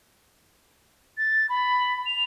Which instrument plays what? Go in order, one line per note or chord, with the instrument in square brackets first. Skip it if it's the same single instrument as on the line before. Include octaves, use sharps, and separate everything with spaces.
[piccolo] A6
B5
F7